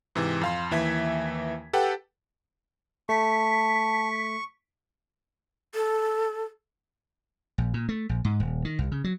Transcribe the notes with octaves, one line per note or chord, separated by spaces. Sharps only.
G#2 C3 E3
F2 F5 C6
D#2 E3 E5 G#6 B6
G4 A4 B4 F#5 G5
A3 A5 C#6 B6
A4
A#1
A#2
A3
A#1
G#2
D#1
D#3
C2
C#3
F#3